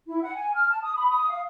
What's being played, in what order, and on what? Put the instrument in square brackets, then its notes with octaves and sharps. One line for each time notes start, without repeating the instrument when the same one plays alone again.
[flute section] E4
F#5
G#5
F6
A5
D#6
B5
D#6
F5